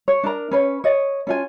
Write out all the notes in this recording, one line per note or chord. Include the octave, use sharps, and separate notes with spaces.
C#5
D4 A#4 A#5
C#4 B4 C#5
C#5 D#5
C#4 F4 G#5